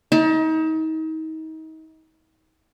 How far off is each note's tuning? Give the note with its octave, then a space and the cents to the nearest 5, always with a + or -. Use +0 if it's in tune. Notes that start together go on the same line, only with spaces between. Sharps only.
D#4 +35 A5 +10